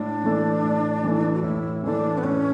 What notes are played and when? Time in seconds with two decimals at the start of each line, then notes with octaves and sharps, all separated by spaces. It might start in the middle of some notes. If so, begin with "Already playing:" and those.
Already playing: A2 D4
0.24 E3 A3
0.63 A2
1.04 E3 A3
1.33 F#4
1.43 A2 E4
1.84 E3 A3 D4
2.18 B3
2.23 A2 C#4